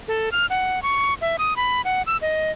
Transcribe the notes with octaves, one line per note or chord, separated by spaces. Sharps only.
A4
F6
F#5
C#6
E5
D#6
B5
F#5
E6
D#5